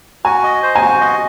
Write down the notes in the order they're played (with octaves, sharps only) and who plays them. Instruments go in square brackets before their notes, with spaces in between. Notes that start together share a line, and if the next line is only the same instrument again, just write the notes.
[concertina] F#4 [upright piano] G#5
[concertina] D#5
C5
[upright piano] G#5
[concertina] F#4
D#5